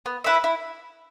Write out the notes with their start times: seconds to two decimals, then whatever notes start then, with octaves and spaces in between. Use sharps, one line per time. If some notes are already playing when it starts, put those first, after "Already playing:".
0.06 B3
0.24 E4 B4 E5
0.44 E4